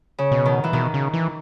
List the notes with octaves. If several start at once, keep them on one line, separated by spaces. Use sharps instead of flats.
C#3
B2
D#3
E3
B2 D#3
C#3
E3